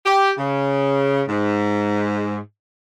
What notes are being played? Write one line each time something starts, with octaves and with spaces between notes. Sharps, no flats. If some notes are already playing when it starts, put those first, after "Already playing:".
G4
C#3
G#2